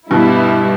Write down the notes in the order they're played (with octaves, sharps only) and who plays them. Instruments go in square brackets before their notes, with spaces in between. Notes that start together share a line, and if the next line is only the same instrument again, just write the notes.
[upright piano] G2 B2 [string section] G3 B3 E4